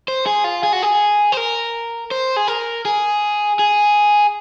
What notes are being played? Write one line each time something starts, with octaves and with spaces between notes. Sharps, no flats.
C5
G#4
F4
G#4
F#4
G#4
C5
A#4
C5
G#4
A#4
G#4
G#4